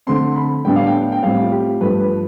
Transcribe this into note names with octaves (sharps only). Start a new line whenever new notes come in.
D3 A3 C4 C6
B5
A2 G3 B3 D4 G5
F5
G5
G5
A2 G3 C4 F5
F4
G4
G2 F3 A3 B4
B4